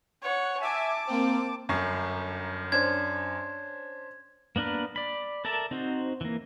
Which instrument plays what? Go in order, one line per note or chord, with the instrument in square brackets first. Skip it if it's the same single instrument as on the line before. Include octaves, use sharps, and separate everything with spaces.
[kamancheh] C#5 F#5
[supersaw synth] E5 G#5 [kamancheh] A5 D6
[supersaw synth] A#3 C4
[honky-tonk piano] G1 C#6 C7 [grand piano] F#2
[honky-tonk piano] C#4 D4 C5 [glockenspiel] G#6
[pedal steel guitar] A#3 B3 D4 A#4 B4
D5 B5
A4 A#4 D5 E5 A5
C4 D#4 F#4 C5
E3 A#3